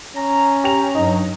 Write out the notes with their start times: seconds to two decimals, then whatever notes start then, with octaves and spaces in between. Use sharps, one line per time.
0.16 C#4 A#5
0.64 G4 A#5 F7
0.95 G2 F#3 D#4